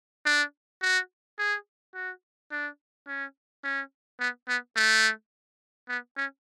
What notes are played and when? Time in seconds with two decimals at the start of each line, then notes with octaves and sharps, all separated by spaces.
0.26 D4
0.82 F#4
1.38 G#4
1.95 F#4
2.51 D4
3.07 C#4
3.64 C#4
4.20 B3
4.48 B3
4.76 A3
5.89 B3
6.17 C#4